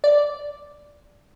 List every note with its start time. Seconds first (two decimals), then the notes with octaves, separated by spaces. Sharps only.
0.04 D5